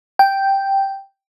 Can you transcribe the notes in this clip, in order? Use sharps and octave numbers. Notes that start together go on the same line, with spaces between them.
G5